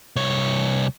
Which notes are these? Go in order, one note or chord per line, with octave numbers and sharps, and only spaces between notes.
C2 C#5